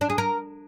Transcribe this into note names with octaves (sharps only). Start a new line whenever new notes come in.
D4
G#4
A#4